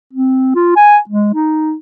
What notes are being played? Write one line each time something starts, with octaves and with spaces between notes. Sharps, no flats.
C4
F4
G#5
G#3
D#4